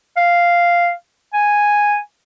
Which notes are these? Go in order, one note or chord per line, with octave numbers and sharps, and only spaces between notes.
F5
G#5